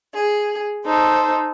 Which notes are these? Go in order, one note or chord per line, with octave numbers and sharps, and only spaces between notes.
G#4
D#4 A4 C5